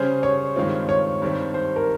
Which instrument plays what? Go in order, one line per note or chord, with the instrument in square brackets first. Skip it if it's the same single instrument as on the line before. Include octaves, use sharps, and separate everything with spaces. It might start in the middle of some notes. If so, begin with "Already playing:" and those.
Already playing: [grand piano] C#3 G3 C#4 G#4 [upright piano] C5
[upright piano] C#5
[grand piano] G2 D#3 G#3 C4 F4
[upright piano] C#5
[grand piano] G2 D#3 G3 C4
[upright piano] C5
A#4